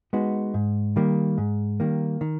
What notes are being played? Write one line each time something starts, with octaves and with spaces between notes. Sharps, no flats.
G#3 B3 D#4 F#4
G#2
D#3 G3 A#3
G#2
D#3 G3 A#3
D#3